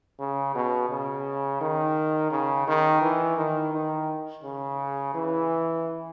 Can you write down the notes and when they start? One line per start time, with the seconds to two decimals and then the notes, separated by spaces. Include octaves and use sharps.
0.19 C#3
0.55 B2
0.90 C#3
1.61 D#3
2.31 C#3
2.67 D#3
3.02 E3
3.37 D#3
3.74 D#3
4.43 C#3
5.15 E3